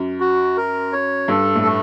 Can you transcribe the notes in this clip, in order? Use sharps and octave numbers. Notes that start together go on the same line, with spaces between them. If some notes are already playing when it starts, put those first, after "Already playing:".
Already playing: F#2
F#4
A#4
C#5
G2 A4
A2
A3